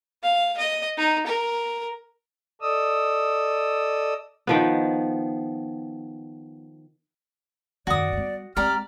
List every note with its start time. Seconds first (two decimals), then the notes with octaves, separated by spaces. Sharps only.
0.23 F5
0.57 D#5
0.97 D#4
1.26 A#4
2.61 A4 D5 D#5 D#6 E6
4.47 D#3 F3 B3
7.87 F#2 D#3 F#4 D5 D#6
8.13 G3 B3
8.56 G#3 C4 G4 D5 A#5 F6